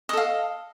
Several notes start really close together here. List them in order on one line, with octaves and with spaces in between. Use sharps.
D#5 A4 F5